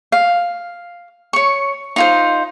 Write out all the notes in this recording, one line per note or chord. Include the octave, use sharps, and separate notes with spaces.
F5
C#5 C#6
D#4 F4 C5